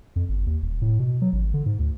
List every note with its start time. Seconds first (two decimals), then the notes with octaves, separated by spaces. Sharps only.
0.16 F2
0.29 G1
0.46 D#2
0.62 D#1
0.82 A2
1.00 B2
1.22 F#3
1.33 G#1
1.54 D3
1.66 G#2
1.79 D2